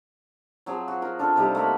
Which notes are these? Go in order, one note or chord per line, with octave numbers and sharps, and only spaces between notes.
F3 F#3 C4 G#4
F#4
F#4 A#4
D4 F4 A4
C3 G3 D#4 C5
A3 A#3 F#4 B5